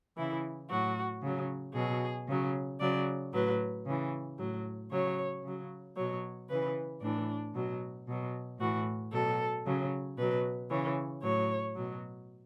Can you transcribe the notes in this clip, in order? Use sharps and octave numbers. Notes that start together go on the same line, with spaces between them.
C#3 E3 E4
A2 F#3 F#4
C#3 F#3
B2 F#3 G#4
C#3 F#3
C#3 F#3 D5
A2 F#3 B4
C#3 E3
A2 F#3
C#3 F#3 C#5
C#3 F#3
B2 F#3 C#5
C#3 E3 B4
A2 E3 D4
B2 F#3
B2 F#3
A2 E3 F#4
B2 F#3 A4
C#3 F#3
B2 F#3 B4
C#3 E3 C#5
A2 F#3 C#5
B2 F#3